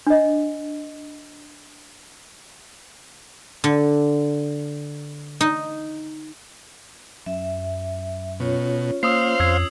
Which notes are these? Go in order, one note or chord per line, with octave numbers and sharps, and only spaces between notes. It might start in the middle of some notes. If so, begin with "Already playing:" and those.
D4 D#5
D3
D#4
F#2 E5
B2 C#4 F4 C#5
A#3 C5 F5 D#6 E6 C7
F2 E6 G#6 C7